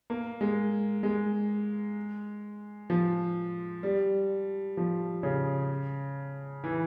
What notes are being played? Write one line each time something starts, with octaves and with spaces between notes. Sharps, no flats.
A#3
G#3
G#3
F3
G3
F3
C#3
E3